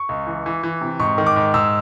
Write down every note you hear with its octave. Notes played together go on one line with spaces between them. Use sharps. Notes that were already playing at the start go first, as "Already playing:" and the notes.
Already playing: C#6
C#2
E3
E3
E3
C3
G#2 C#6
D#3
D6
G#2
G#2 E6